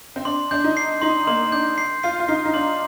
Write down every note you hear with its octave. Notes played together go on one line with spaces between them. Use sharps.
C4
D4 C6
D4 G6
D#4
C7
D#4 C6
A#3 C6
D4 G6
C7
F4 C7
F4
D#4 C7
D#4
D4 C6